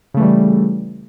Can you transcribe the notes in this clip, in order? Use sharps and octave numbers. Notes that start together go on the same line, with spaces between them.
C#3 E3 G3 A3